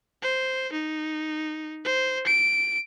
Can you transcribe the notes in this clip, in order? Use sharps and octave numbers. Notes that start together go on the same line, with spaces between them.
C5
D#4
C5
D7